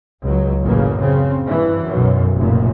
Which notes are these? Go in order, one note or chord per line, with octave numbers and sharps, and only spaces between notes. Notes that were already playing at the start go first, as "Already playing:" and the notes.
C#2 F#3
A1 F#2 C#3 A#3
C#3 C4
G2 E3
B1 F#2
F1 F#2 A#2